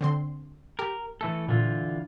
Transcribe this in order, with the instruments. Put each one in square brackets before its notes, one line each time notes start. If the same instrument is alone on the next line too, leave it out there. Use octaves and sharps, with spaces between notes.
[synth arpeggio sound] D3 C4 C6
[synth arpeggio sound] G4 [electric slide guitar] A#4
[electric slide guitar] E3 A3 A4
[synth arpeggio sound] A#2 [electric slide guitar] D3 E3 F4